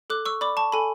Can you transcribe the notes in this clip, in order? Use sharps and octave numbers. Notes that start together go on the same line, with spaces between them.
A4 D6 F#6
C#6 E6
D5 B5 D6
A5 C#6
A4 G#5 B5